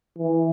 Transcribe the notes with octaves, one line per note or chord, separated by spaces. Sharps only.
E3